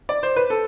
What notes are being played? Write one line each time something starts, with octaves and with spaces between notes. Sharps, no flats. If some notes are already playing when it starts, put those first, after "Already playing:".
D5
C5
B4
A4